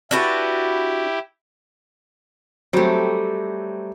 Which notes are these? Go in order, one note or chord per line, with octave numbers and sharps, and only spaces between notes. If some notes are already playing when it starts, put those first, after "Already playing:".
D4 E4 F#4 G4 B4
F#3 G3 A3 C4